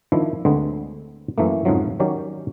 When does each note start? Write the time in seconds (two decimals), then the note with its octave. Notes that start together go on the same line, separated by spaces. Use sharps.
0.12 D#3 F3 D4 E4
0.45 D2 D3 G#3 B3 C4
1.38 F#2 E3 A3 A#3
1.65 F2 G#2 C#3 F3 F#3
2.00 D#3 F#3 C#4 G4 D5